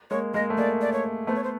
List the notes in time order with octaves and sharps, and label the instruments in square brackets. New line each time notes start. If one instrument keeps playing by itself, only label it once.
[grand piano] G#3 A#3 [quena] C#5
[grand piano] G#3 A#3 [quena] D#5
[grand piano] A3
[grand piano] G#3 A#3 [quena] D5
[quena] D5
C#5
[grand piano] A3 B3 [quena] C5
[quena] C#5
C5